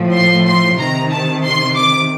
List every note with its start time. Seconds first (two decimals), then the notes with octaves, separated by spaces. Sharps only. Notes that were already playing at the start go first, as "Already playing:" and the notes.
Already playing: A2 F3
0.14 C6
0.46 C6
0.78 C3 D#3 A#5
1.11 A5
1.44 C6
1.76 D6